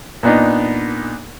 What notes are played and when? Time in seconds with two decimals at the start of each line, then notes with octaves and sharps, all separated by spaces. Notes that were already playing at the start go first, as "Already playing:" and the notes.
0.23 A#2 B3 D4 D#4